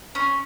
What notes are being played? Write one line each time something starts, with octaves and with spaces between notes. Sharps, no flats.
C#4